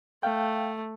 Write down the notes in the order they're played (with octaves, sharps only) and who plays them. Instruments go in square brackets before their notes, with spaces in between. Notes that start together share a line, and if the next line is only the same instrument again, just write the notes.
[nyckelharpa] A3 [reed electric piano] F5 G5